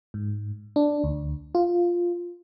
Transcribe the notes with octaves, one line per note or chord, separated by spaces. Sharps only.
G#2
D4
D2
F4